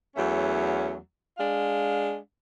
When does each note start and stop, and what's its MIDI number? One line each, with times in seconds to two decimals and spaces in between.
0.16 0.97 40
0.16 0.97 54
0.16 0.97 57
0.16 0.97 61
1.38 2.16 56
1.38 2.16 62
1.38 2.16 77